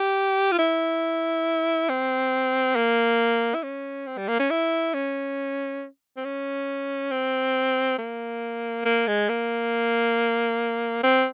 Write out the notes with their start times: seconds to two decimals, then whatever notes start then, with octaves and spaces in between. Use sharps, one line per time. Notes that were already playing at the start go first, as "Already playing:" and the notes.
Already playing: G4
0.52 F4
0.59 E4
1.89 C4
2.76 A#3
3.55 E4
3.63 C#4
4.07 C4
4.17 G3
4.28 A#3
4.39 C#4
4.50 E4
4.94 C#4
6.17 C4
6.25 C#4
7.11 C4
7.99 A#3
8.85 A#3
9.08 G#3
9.29 A#3
11.03 C4